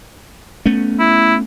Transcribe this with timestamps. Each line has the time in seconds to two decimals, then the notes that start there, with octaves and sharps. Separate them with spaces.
0.66 A3 B3 C#4
0.99 E4